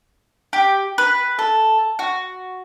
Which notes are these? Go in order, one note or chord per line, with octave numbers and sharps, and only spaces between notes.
G4
B4
A4
F#4